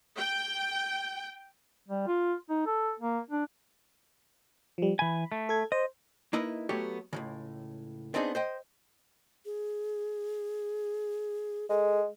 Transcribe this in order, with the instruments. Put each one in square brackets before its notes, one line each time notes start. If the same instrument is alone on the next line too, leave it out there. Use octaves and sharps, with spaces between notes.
[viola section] G5
[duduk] G3
F4
D#4
A4
A#3
D4
[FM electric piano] F3 G3
[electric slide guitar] E3 G#5 [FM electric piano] B5
[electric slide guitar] A3
[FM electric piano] A4 G#6
[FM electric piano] C5 [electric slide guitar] D#5
[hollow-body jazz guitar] A#3 D#4 E4 B4 D#5
F#3 A3 B3 G4 C#5
C#2 A2 C#3
B3 C4 D4 D#4 F4 G#4
C5 D#5 G5
[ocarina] G#4
[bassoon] G#3 [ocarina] A4